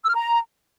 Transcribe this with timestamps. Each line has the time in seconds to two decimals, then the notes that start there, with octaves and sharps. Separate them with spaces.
0.04 E6
0.10 F6
0.16 A#5